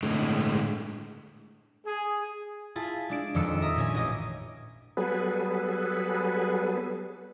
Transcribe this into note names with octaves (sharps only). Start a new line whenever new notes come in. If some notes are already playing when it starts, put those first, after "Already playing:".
A2 D3 G#3
G#4
E4 F4 G#4 G#5 A5
G#3 D4 D7
D#1 F2 D#3 D6 E6 C#7
E5 A#5 D#6
A#2 C#4 G#5
A1 D#5 D6
F#3 G3 B3 G#4 A4 B4